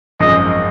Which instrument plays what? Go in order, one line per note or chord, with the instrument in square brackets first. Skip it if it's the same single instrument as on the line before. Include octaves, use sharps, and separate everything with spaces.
[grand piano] G#1 F#2 F3 G#3 [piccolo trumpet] D#5